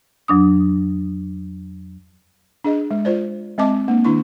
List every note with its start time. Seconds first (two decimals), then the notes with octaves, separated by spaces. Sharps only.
0.28 F2 F#3 D4 D#6
2.64 D4 G#4 D#5
2.91 G#3
3.05 F4 C5 D5
3.58 G#3 C4 D#5 A5 D6
3.88 A#3 D4
4.04 D#3 D4 E4 C#6